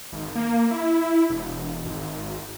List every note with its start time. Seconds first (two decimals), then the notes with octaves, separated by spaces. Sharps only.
0.12 G#1
0.35 A#3
0.71 E4
1.30 E1
1.85 G#1